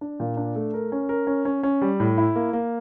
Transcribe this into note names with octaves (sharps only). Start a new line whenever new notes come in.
D4
A#2
D4
A3
A#4
C#4
A#4
C#4
C#4
C#4
G3
A2
E4
A#3
A#3